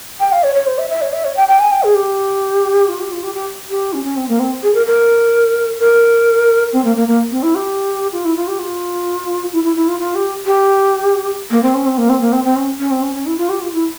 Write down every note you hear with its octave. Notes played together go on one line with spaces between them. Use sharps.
G5
F5
C#5
C#5
C5
E5
E5
C#5
E5
C#5
G5
G5
G#5
G5
G#4
G4
F4
G4
F4
G4
G4
G4
C#4
C#4
C4
A#3
C4
G#4
A#4
A#4
A#4
C4
A#3
A#3
A#3
C4
E4
G4
F4
E4
F4
G4
F4
E4
E4
E4
F4
F4
G4
G4
A#3
C4
C#4
C4
A#3
C4
A#3
C4
C4
C#4
C#4
C4
C#4
C#4
E4
F4
G4
F4
E4